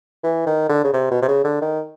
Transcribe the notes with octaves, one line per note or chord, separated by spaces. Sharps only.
E3
D#3
D3
C#3
C3
B2
C3
C#3
D3
D#3